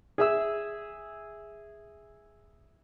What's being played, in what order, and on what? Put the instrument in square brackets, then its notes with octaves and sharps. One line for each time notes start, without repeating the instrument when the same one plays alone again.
[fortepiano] G#4 E5 E6